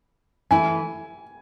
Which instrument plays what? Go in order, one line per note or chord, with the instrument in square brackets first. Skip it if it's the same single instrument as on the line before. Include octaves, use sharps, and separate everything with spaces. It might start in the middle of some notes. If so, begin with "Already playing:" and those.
[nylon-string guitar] E3 A3 E4 [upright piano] G#5